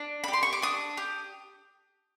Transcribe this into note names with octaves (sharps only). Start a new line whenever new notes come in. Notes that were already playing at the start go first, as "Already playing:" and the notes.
Already playing: D4
B5
G4
C6
C#6
D6
D4 D#6
G4